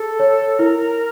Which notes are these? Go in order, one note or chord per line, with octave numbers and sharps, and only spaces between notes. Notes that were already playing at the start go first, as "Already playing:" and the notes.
Already playing: G#4 A4
C#5
E4 A#4